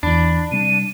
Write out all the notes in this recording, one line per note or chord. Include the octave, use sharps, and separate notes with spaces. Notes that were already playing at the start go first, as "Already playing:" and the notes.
E2 E3 D4 B5
C3 G3 D#7